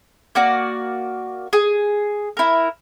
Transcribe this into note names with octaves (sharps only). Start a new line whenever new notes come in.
A#3 F#4 D5
G#4
E4 A#4